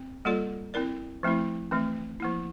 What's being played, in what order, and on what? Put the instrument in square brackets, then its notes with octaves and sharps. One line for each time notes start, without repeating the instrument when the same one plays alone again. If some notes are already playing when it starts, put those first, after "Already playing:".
Already playing: [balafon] C4
G3 A#3 F4 A4 D5
C4 E4 A#4 D5
F3 A3 C4 E4
E3 A3 C4
F3 A#3 E4